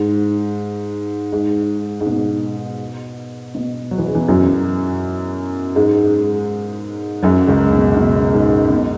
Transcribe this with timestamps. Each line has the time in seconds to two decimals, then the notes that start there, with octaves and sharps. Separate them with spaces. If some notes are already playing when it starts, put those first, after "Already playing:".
Already playing: G#2
1.32 G#2
2.01 G#2
2.06 B2
3.55 B2
3.91 F#3
3.98 E3
4.07 C#3
4.15 E2 E3
4.28 F#2 F#3
5.75 G#2 G#3
7.23 F#2 F#3
7.47 C#2 C#3
7.73 B2
7.97 B2
8.33 G#2
8.70 B2